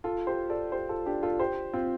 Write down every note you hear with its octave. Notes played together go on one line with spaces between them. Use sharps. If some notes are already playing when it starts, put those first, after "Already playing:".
F4 A4
G4 C5
A4 D5
G4 C5
F4 A4
D4 G4
F4 A4
G4 C5
C4 F4